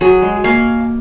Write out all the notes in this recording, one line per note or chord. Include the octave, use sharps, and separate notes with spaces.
F#3 G#4
G#3
A#3 C#5 F5 G#5